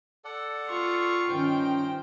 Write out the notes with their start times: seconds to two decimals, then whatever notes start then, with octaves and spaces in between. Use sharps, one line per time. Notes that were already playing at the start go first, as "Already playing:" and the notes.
0.25 A4 D5 F#5
0.68 F4 C#6
1.29 G2 D#3 C#4 C5 G5 F6